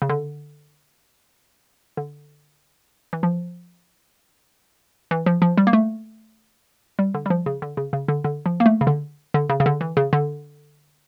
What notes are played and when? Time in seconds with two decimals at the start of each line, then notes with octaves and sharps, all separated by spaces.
0.02 C#3
0.09 D3
1.97 D3
3.13 E3
3.23 F3
5.11 E3
5.26 F3
5.42 F3
5.57 G3
5.67 A#3
5.73 A3
6.99 G3
7.14 D3
7.26 G3
7.30 F3
7.46 C#3
7.62 D3
7.77 C#3
7.93 C#3
8.08 D3
8.24 D3
8.46 F3
8.60 A#3
8.66 A3
8.81 C#3
8.87 D3
9.34 D3
9.49 C#3
9.60 C#3
9.66 D3
9.81 E3
9.97 C#3
10.13 D3